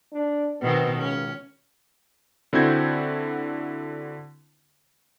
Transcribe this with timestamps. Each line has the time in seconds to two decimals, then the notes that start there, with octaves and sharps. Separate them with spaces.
0.12 D4
0.61 B2 D#3 B3 C4
0.96 C#2 C#4
2.53 D3 C4 E4 F#4 G6 G#6